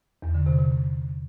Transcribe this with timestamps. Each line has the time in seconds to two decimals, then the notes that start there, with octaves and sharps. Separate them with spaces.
0.22 E2
0.34 D3
0.46 C3
0.58 C3